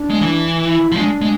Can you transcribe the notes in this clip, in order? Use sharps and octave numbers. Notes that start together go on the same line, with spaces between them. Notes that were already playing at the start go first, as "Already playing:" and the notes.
Already playing: D4
G#3
E3
E4
F3
G#3 D4
G#3